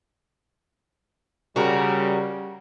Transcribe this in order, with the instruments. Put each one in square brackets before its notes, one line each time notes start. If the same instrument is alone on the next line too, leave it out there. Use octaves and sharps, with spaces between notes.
[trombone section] C#3 G3 [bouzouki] F#4 A#4